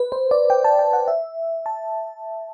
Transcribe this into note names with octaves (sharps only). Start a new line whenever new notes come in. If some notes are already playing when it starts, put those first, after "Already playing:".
Already playing: B4
C5
D5
G5
A5
G5
F#5
E5
A5